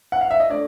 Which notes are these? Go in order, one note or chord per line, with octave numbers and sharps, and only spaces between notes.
F#5
F5
E5
D#5
A3 D4 D5